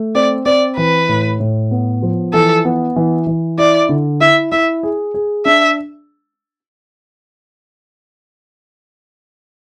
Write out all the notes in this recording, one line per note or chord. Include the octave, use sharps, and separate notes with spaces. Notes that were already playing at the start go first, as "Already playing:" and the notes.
Already playing: A3
C4 D5
C4 D5
E3 B4
A2
A2
B3
F3
E3 A4
B3
E3
E3
E4 D5
D3
E4 E5
E4 E5
G#4
G#4
D4 E5